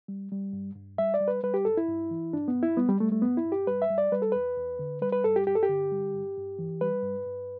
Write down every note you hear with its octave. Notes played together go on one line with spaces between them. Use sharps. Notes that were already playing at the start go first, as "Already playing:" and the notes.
G3
G3
G2
G2
G3 E5
D5
G3
B4
G3 B4
G4
G2 A4
E4
G2
E3
G2 D4
B3
G2
E4
G3 B3
G3
G3 A3
A3
G2 B3
E4
G2
G4
G3 B4
E5
G3
D5
G3 B4
A4
E2 B4
E2
D3
G3 B4
B4
G2 A4
G4
G2 G4
A4
G4
D3
G3
G2
G2
E3
G3 B4
G2
G2